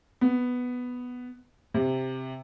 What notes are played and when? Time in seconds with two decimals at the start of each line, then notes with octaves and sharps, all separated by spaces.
0.21 B3
1.74 C3